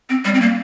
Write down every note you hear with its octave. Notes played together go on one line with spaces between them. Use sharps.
C4
G3
C4
A#3